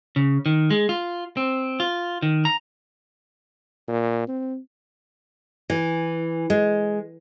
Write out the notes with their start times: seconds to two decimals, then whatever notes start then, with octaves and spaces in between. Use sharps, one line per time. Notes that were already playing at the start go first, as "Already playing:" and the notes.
0.16 C#3
0.46 D#3
0.70 G#3
0.89 F4
1.37 C4
1.80 F4
2.22 D#3
2.45 A#5
3.88 A#2
4.28 C4
5.70 E3
6.50 G#3